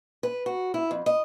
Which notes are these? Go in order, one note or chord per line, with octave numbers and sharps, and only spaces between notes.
B4
F#4
E4
F2
D#5